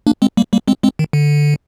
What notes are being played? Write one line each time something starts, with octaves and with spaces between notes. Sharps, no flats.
A#3 D4
G#3 C4
G3 A#3
G3 A#3
G#3 C4
G#3 C4
D#3
D3